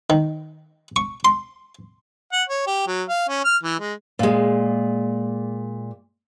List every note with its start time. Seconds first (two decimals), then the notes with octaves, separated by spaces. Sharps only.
0.10 D#3
0.96 C#6
1.25 C6
2.32 F#5
2.49 C#5
2.67 G4
2.87 F#3
3.09 F5
3.28 C#4
3.45 F6
3.63 E3
3.80 G#3
4.19 A#2 G#3